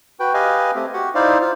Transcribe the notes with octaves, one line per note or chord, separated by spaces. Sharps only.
F#4 B4 G5
G4 B4 D#5 F5 G#5
A3 C4 G4
F#4 G4 F#5
D#4 E4 C5 D5 F5
F4 C5 F5